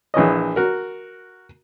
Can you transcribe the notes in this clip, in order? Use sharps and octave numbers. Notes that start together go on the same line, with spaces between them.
A#1 E3 C#5 D#5
F#4 A#4